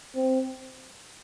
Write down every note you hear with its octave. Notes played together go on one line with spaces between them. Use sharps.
C4